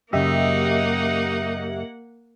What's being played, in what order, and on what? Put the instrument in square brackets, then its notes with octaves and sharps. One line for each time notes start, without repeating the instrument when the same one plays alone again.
[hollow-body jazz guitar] F#2 C#3 [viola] A#3 F#5 [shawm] D#4 [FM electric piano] G4 D#5 E5